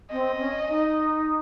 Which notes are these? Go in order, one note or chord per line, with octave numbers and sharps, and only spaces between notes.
C4 D#5
C#4
D#4